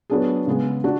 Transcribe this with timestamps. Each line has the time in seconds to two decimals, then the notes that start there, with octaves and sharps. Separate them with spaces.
0.10 F#3 B3 D4 G#4
0.47 C#3 G#3 B3
0.84 D4 F#4